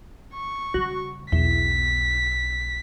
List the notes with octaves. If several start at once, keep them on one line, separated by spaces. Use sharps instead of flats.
C#6
C#3 G3 F#4
B1 E2 B6